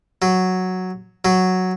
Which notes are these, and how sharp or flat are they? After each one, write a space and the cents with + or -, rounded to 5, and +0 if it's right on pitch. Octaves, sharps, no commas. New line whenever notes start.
F#3 +0
F#3 +0